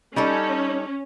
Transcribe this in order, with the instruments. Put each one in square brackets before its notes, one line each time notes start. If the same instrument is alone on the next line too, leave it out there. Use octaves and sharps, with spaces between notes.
[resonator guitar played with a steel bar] G3 D#4 A4 [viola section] C#4